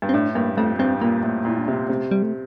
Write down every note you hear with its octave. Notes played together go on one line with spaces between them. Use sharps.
G2
C4
A2 D4
G2 A#3
F2 A3
G2 C4
A#2 A#3
A2
A#2 E4
D4
C3 C4
A#3
C3 A3
G3
A3